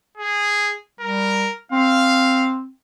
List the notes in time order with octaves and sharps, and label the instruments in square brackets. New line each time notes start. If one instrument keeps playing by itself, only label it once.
[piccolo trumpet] G#4
[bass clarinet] G3 [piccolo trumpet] A#4
[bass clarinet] C4 [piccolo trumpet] F5